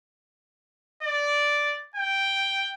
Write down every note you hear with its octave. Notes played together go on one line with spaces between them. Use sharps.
D5
G5